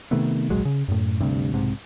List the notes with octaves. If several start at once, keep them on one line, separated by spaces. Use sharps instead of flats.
C3 D#3 A3 B3
D1 A#1 F#3 G#3
C#3
F#2 A2
D2 G2 C3
B1 G#2 C3